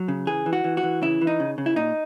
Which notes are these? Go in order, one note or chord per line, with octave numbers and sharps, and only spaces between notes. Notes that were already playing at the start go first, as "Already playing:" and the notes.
Already playing: F#3
C#3
E3 G#4
E3
F#4
E3
F#4
E3
C#3 E4
E3
D#4
C#3
C#3
E4
A#2 D#4